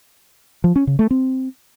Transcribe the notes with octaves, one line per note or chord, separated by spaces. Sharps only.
F3
C#4
C#3
A3
C4